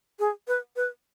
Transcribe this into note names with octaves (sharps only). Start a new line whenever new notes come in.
G#4
B4
B4